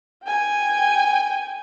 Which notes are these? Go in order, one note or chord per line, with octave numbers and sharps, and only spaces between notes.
G5 G#5